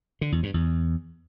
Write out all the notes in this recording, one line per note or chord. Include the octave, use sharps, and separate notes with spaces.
D3
E2
G2
E2